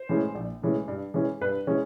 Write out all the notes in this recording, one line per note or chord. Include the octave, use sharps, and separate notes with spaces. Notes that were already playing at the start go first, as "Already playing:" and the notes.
Already playing: C5
A2 E3 G#3 C#4
A#1
A2 E3 G#3 C#4
G2
E3 G#3 C#4
G2 B4
E3 G#3 C#4